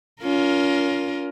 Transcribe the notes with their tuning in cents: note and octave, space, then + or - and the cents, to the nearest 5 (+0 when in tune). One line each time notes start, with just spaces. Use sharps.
C#4 +40 F4 +0 A#4 +15